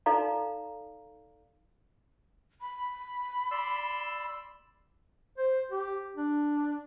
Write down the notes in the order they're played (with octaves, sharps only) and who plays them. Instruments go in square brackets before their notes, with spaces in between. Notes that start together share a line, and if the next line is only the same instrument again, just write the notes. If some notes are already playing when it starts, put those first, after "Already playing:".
[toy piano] D#4 A4 D5 F5 A#5
[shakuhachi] B5
[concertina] D5 C6 E6
[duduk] C5
G4
D4